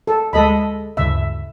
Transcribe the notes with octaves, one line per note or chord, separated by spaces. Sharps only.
A4
D2 G#3 A4 D#5 B5
D2 G2 C#3 E5